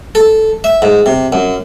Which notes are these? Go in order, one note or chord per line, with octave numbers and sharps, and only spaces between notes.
A4
E5
G#2
C3
F#2